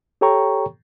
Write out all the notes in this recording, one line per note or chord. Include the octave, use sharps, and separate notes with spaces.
G4 A4 C#5 G5 A#5 C#6